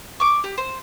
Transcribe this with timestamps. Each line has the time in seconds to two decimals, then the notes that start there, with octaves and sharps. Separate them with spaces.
0.20 C#6 D6
0.44 G4
0.58 C5